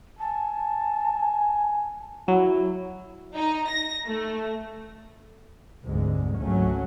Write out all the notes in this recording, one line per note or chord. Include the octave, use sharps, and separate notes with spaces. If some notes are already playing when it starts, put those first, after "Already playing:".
G#5 A5
F#3 E4
D#4
A#6
A3
F1 D2 G#2 D3 G#3
G#1 C#2 F#3 A3 C#4